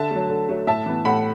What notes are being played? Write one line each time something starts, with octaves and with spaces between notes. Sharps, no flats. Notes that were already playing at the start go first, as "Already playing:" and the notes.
Already playing: D3 E5 A5
F#3 A3
D3
F#3 A3
A2 E5 A5
E3 B3
A2 F#5 B5